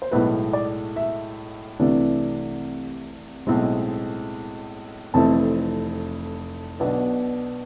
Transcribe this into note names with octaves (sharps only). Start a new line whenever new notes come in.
C5
B1 A2 G#3 B4
D5
E5
C2 C3 E3 A3 D4
B1 A2 G#3 C4
F1 F2 E3 A3 C4 A5
B1 B2 B3 D4